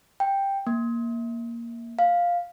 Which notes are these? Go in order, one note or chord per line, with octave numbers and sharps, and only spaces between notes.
G5
A#3
F5